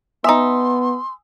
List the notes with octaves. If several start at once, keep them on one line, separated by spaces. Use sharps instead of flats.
B3 D#4 E5 G#5 C6 D#6 E6